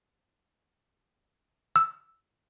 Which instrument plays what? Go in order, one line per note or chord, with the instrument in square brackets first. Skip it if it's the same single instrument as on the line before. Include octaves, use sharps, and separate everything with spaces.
[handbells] E6